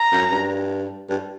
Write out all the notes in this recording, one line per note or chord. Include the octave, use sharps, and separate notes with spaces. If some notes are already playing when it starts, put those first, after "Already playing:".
Already playing: A#5
F#2
G2
G2